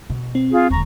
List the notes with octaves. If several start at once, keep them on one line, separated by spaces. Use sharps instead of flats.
B2
C4
F4 G#4
D#1 D2 A#5 C#6